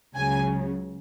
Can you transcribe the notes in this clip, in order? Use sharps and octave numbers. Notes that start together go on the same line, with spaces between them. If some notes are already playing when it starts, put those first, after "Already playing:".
C#2 C#3 F#3 G#5